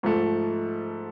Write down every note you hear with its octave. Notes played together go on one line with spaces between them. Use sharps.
G#2 F3 A3